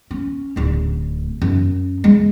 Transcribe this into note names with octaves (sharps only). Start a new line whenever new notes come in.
C#4
D1 D2
F#2
G#3